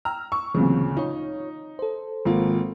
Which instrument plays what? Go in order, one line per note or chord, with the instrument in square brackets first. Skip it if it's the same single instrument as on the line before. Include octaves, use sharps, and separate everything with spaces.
[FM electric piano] G5 E6 F6 [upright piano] A#5
[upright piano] C#6 [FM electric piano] E6
[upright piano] D2 A#2 C#3 [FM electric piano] E3 F#3 C4
[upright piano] D#4 [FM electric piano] F4 C#5
[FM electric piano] A4 C5
[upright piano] G#1 F3 A#3